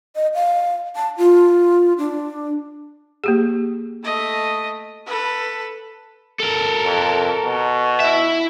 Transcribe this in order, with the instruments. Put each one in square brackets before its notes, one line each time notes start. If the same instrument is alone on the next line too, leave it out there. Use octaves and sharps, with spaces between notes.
[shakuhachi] D#5
F5
A5
F4
D4
[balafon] A#3 G4 G#4
[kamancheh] A3 D#5
A4 B4
[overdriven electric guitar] A4 A#4
[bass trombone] F2
B2
[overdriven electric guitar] E4 E5